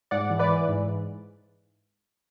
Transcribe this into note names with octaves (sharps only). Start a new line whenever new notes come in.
G#2 D5 F#5
E3
B4 D5
E3
G#2
G#2